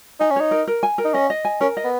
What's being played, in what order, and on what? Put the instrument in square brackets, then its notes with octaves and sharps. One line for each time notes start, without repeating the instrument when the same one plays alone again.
[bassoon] D#4 [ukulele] G#5
[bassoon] C#4
[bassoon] D#4 [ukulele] C#5
[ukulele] A#4
A#4
G#5
A#4
[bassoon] D#4
[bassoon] C#4 [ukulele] D#5
[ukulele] D#5
G#5
[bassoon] C#4 [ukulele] A#4
[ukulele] D#5
[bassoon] B3